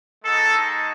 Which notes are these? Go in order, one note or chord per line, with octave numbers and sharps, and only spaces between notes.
G#3 D#4 F#4 A4